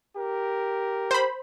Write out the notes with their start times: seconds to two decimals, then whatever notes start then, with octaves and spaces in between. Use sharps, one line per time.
0.16 G4 A#4
1.11 C5 B5